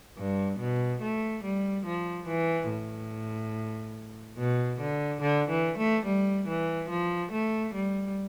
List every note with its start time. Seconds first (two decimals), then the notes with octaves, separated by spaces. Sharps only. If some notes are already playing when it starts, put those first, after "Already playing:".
0.17 G2
0.59 B2
1.02 A3
1.43 G3
1.85 F3
2.27 E3
2.69 A2
4.37 B2
4.80 D3
5.21 D3
5.50 E3
5.77 A3
6.05 G3
6.48 E3
6.89 F3
7.32 A3
7.74 G3